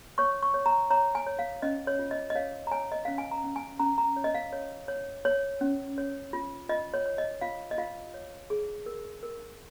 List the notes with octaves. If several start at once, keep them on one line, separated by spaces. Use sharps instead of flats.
C#5 C#6
C#6
C#5
A#5
C#5 A#5
G#5
C#5
F5
C#4 D#5
C#5
F4
D#5
D#5
C#5 F5
A#5
C#5 G#5
D#5
C#4 F5
G#5
A#5
C#4
G#5
C#4 A#5
A#5
C#5
D#5
F5
C#5
C#5
C#5
C#4
C#5
F4
F4 D#5
C#5
C#5
D#5
F4 F5
D#5
F4 F5
C#5
G#4
A#4
A#4